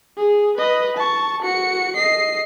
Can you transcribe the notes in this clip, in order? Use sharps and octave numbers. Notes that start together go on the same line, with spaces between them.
G#4
B4 D#5
A5 C#6
F#4 C#7
D#5 C7